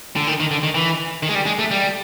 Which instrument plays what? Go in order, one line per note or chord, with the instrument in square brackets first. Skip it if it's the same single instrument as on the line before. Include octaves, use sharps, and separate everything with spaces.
[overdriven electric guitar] D3
D#3
D#3
D3
D#3
E3
D#3
G#3
G3
G#3
A3
G3